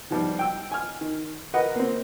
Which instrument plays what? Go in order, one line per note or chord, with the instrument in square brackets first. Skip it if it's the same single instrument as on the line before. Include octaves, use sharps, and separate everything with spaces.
[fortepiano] G#2 F3 G3
G5 E6
G#5 F6
D#3
A#4 B4 D#5 F#5
A#3 C4